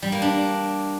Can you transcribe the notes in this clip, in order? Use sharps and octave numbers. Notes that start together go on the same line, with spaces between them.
G3
A#3
D4